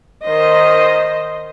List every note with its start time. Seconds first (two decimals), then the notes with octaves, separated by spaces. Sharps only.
0.24 D#3 C5 D#5